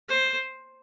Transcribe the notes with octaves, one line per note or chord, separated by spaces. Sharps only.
C5